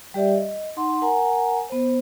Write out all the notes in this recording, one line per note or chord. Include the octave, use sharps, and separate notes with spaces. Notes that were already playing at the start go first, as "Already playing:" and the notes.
G3 G4 D5 E5
D#5
D#4 F#5 C6
A#4 F#5 G#5 A#5
B3 C5